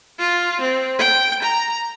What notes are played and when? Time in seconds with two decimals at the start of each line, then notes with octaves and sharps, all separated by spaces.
0.19 F4
0.61 C4
0.99 G5
1.43 A#5